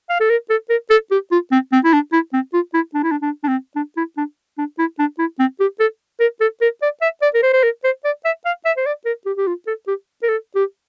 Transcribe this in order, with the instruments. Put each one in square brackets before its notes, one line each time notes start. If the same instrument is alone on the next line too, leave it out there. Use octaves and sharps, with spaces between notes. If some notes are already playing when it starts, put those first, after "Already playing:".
[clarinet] F5
A4
A#4
A4
A#4
A4
G4
F4
C4
C4
E4
D4
E4
C4
F4
E4
D4
E4
D4
D4
D4
C4
D4
E4
D4
D4
E4
D4
E4
C4
G4
A4
A#4
A4
A#4
D5
E5
D5
A#4
C5
C5
A#4
C5
D5
E5
F5
E5
C5
D5
A#4
G4
G4
F4
A4
G4
A#4
A4
G4